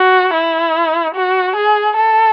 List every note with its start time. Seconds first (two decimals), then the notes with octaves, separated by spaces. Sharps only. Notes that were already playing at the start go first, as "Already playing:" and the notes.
Already playing: F#4
0.34 E4
1.15 F#4
1.56 G#4
1.97 A4